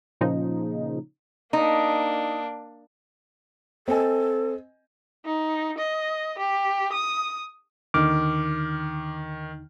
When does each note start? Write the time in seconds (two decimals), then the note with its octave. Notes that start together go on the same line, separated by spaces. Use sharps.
0.21 A#2 C#3 F3 D#4
1.53 A#3 D4 D#4
3.88 C4 A4 D#5 G#5
5.25 D#4
5.78 D#5
6.38 G4
6.93 D#6
7.94 D#2 D3 D#3 D#4 D6 F6